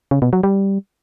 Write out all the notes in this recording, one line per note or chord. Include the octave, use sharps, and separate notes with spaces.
C#3
B2
F#3
G3